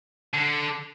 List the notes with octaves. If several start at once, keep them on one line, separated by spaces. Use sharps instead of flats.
D3